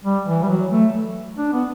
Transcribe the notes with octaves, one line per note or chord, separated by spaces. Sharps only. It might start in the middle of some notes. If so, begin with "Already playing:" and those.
G3
E3
G3
F#3
A3
D4
B3